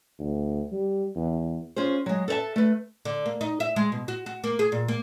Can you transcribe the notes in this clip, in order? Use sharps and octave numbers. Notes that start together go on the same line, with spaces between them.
D2
G3
E2
C#4 F4 G#4 C5
F#3 G#3
A4 B4 C5 E5 A5
A3 B4
D3
A#3
D#4
E5
G#3
B2
F#4
F#4
A#3
G#4
A#2
A#3